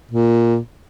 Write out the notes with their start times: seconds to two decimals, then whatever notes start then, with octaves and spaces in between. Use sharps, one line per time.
0.12 A#2